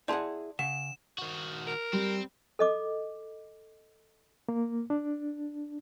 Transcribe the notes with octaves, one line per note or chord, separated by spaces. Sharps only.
E4 G#4 D5 F#5 A5 C6
C#3 F#5 E7
D#3 F#4
A#4
G3 C4
A4 D#5 D6
A#3
D4